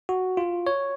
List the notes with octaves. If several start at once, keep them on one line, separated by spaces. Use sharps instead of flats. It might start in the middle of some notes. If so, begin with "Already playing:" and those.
F#4
F4
C#5